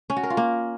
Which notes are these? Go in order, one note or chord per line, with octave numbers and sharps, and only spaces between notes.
C#4
F#4
A#4
F4
A#3